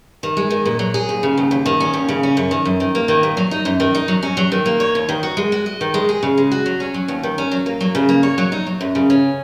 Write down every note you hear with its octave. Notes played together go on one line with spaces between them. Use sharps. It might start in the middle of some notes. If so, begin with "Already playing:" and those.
D#3
G#3
D#3
A#2
F#3
G#4
D#2
C#3
D#2
D#2
D#3
C#4
D#2
C#3
C#4
F#2
D#3
F#2
D#3
A#3
D#3
A#2
F#3
D#4
F#2
D#3
D#4
F#3
C#4
F#3
D#3
A#3
C#5
D#2
D#3
F#4
G#3
F#4
D#5
D#3
G#3
G#4
C#3
G#3
F#4
F#3
C#4
F#3
D#2
D#3
C#4
F#3
A#3
F#3
C#3
A#3
C#5
F#3
D#4
F#3
F#2
C#3
C#4